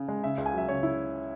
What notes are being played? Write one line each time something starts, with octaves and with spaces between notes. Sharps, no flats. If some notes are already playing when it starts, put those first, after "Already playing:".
Already playing: C#3
G#3
C#3 E5
C#2
G#5
F#3 E5
C#3 C#5
E4